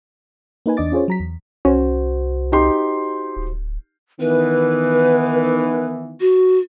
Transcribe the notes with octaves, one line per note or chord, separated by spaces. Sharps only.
A#3 D#4 B4 G#5
E2 D4 D#5 D6 A6
C#4 F4 G#4 C5 C#5
F#3 A#5 B6
E2
C2 C#4 F#4 C5
D#4 G4 C6
D1
D#3 E3 B3 B4
F#4